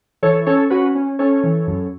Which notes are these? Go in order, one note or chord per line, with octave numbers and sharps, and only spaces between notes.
E3 A4 C#5
C#4 A4 C#5
C#4 F#4 B4
C#4
C#4 A4 C#5
E3
F#2